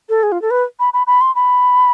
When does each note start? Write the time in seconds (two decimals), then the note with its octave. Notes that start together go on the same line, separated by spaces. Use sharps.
0.09 A4
0.23 G#4
0.32 F4
0.42 A4
0.51 B4
0.80 B5
0.94 B5
1.07 B5
1.21 C6
1.35 B5